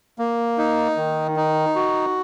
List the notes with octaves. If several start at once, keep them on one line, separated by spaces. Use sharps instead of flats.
A#3
D#4
D#3
D#4
F#4